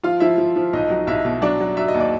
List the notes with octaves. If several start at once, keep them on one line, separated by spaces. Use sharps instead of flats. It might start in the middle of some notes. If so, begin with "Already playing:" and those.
F3 F4 F5
F3 E4 E5
F3
F3
B1 D#4 D#5
F#3
B1 E4 E5
B2
F#3 D4 D5
F#3
F#3 E5
D#5
D#2
D5